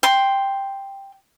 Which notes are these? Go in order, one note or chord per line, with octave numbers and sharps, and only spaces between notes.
G5 C6